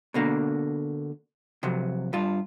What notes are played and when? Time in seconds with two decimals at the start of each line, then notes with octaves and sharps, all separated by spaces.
0.14 B2 D3 A#3
1.63 C3 F3 F#3
2.13 G2 F4